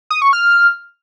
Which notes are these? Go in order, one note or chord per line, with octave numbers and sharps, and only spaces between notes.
D#6
C#6
F6